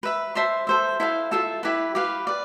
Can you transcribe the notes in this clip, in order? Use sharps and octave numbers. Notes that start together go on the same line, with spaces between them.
B4 E5 B5
C5 E5 A5 C6
A4 C5 E5
E4 A4 C5 F5
F4 A4 E5 A5
E4 G4 B4
G4 B4 F5
B4 D5